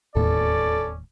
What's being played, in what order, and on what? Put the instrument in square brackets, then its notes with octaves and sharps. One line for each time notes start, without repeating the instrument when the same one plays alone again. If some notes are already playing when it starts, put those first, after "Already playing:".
[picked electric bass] E1 D#2 A2 [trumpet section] C#4 D5 [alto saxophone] A4